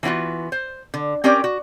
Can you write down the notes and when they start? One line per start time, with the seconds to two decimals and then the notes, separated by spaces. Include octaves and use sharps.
0.03 E3 B3 C4 F4 F#4
0.52 C5
0.94 D3
1.24 C4 C#4 G4 A#4 D5
1.44 F#4